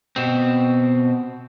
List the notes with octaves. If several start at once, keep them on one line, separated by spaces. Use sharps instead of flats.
B2 C4